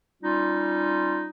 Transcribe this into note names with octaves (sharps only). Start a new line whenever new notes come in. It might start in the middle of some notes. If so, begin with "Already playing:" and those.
G3 C#4 D#4 F4